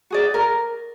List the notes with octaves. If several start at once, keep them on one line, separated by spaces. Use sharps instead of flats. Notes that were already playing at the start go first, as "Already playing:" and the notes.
F#4 G#4 D5
A#4